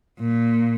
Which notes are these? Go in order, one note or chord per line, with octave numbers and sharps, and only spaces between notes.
A#2